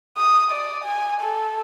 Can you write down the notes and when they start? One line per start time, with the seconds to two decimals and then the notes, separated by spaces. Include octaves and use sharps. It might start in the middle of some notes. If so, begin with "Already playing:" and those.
0.17 D#6
0.51 D5
0.84 G#5
1.21 A4